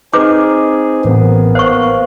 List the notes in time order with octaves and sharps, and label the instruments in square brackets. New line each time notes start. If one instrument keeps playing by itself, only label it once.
[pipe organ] C4 G#4 [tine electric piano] D#4 [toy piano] B4 D6
[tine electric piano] A1 [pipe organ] A#3 B3
[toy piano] C5 C#6 [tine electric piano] F5